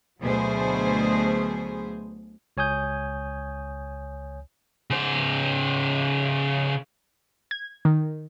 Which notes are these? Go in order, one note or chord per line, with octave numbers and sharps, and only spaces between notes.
D2 B2 F#3 A3 G#4 C5
C#2 C#5 G#5 D#6 G6
C#3 C5
G#6
D#3